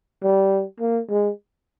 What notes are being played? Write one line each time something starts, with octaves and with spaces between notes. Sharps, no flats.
G3
A#3
G#3